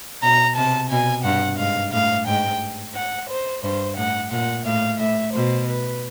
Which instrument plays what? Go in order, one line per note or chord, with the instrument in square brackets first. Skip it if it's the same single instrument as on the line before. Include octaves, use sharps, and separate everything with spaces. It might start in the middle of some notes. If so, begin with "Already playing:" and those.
[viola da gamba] B2 [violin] A#5
[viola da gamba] C3 [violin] A5
[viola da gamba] B2 [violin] G#5
[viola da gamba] G2 [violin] F#5
[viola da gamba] G#2 [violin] F5
[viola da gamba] A2 [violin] F5
[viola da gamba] G#2 [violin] G5
[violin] F#5
C5
[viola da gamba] G2 [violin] C5
[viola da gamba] A2 [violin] F#5
[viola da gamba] A#2 [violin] F#5
[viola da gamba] A2 [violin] F5
[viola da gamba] A2 [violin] E5
[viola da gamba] B2 [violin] C5
[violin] B4